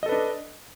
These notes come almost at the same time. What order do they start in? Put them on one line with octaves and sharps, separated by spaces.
D#5 A4 B4 D4